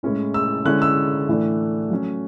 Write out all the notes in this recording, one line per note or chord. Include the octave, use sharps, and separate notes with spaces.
A2 G#3 C#4 E4
E6
D3 G#3 C#4 E4 F#6
E6
A2 E3 A3 D4
F#3 A3 C#4